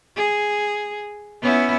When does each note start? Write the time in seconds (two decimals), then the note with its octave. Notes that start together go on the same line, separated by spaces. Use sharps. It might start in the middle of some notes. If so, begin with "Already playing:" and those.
0.16 G#4
1.42 B3 C#4 E4